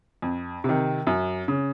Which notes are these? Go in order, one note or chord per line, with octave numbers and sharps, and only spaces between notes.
F2
C3 D#3
F#2
C#3